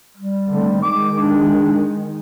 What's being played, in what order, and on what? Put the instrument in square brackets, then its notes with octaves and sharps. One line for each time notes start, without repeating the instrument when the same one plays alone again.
[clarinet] G3
[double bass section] D3 A3 C4
[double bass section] D#3 G#3 [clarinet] D6
[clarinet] D4